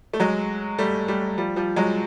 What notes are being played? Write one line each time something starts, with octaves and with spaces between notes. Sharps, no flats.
A3
F#3 G#3
G3 A3
G3 A3
F3 G3
F3 G3
F#3 G#3